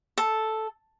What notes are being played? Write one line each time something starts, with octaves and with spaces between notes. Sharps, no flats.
A4